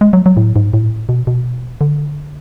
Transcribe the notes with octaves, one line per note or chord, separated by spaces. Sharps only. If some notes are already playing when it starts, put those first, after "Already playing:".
G#3
F#3
F#3
A2
G#2
A2
B2
B2
D3